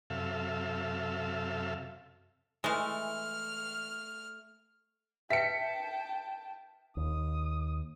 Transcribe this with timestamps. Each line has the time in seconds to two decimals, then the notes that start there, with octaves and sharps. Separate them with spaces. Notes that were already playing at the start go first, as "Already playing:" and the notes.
0.10 F#2 C3 A4 E5 F5
2.64 E3 G#3 A3 F6
5.30 B4 E5 G5 A5 B6 C#7
6.97 D#2 D#6